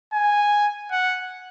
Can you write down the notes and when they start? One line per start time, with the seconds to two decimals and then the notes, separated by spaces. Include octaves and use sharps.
0.13 G#5
0.91 F#5